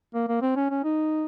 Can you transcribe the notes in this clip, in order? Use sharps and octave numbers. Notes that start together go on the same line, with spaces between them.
A#3
A#3
C4
C#4
C#4
D#4